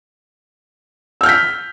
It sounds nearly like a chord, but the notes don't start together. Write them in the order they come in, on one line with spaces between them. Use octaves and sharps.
E6 F6 G6 B6